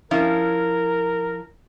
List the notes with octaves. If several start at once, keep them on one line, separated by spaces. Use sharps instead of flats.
F3 C#4 E4 A#4